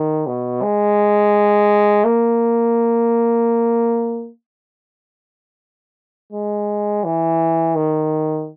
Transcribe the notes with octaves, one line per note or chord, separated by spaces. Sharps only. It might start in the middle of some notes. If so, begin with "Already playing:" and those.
Already playing: D#3
B2
G#3
A#3
G#3
E3
D#3